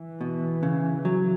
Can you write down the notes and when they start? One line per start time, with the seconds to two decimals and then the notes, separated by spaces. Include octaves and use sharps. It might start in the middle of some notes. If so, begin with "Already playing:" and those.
Already playing: E3
0.21 B2
0.63 C#3
1.05 F#3